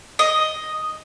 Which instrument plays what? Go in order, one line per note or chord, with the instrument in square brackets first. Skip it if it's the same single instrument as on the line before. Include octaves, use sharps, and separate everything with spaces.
[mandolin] D#5